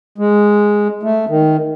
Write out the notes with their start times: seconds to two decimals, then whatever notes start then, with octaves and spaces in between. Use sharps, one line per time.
0.18 G#3
1.03 A3
1.29 D#3